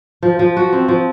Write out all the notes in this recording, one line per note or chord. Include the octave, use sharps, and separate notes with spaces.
F3
F3
F#4
C4
F3